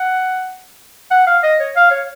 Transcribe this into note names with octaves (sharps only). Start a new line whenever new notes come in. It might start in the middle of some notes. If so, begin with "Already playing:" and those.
Already playing: F#5
F#5
F5
D#5
C#5
F5
C#5